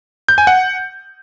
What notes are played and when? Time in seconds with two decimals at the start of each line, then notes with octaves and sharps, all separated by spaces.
0.29 G6
0.38 G#5
0.47 F#5